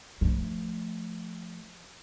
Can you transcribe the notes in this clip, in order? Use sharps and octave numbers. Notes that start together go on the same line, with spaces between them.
F3 A3